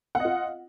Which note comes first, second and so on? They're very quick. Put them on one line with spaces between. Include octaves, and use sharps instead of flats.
F#5 D#5 F4